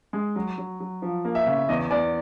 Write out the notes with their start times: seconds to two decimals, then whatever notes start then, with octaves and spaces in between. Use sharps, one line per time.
0.13 G#3
0.36 F#3
0.58 F#3
0.80 F#3
1.02 F3
1.25 A#3
1.35 E5
1.46 C#3
1.69 E2 D#5
1.91 E2 D5